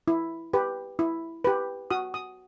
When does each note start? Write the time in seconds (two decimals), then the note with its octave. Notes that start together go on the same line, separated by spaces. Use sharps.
0.08 E4
0.53 G4 B4
0.99 E4
1.44 G4 B4
1.90 F#4 D#6
2.14 D#6